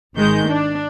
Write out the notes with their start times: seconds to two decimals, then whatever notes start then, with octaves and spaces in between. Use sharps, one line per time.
0.16 G#1 D#3 G#3 G6
0.49 D4